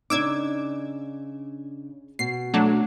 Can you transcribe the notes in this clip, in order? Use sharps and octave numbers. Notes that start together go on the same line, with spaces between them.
C#3 D4 D#4 D6 E6 G#6
B2 C7
F#3 A3 D4